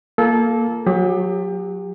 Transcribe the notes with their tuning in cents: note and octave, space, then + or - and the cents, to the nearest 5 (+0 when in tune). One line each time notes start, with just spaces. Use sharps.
A#3 +0 F4 +0 A4 -20
F#3 -25 G4 +30